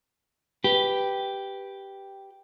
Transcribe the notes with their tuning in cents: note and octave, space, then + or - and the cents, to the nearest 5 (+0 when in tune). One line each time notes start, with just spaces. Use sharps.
G4 +0 B4 +0